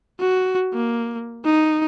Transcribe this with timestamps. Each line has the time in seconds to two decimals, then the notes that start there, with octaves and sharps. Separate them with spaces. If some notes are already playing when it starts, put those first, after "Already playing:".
0.20 F#4
0.74 A#3
1.45 D#4